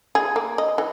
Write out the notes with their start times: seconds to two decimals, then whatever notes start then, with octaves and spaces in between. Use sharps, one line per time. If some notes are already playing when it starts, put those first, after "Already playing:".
0.15 G#4
0.36 A#3
0.58 D#5
0.78 E3